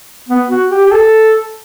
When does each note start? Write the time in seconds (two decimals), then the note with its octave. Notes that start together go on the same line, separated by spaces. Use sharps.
0.28 B3
0.49 F#4
0.70 G4
0.86 G4
0.92 A4